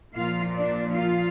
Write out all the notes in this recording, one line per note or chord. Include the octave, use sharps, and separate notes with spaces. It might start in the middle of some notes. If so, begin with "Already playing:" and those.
A#2 F3 A#3 F4 F5
D4 D5
F4 F5